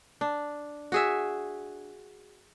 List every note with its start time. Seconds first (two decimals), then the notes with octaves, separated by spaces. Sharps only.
0.21 D4
0.92 F#4 G#4 E5